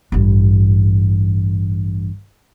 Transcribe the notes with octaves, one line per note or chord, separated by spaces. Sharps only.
A1 G2